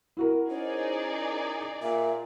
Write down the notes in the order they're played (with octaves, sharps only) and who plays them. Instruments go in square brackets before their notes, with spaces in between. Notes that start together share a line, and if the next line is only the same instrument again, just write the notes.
[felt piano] E4 F#4 A#4
[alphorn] C#4 [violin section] D#4 G#4 D5 [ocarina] C5
[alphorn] A#2 [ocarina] E5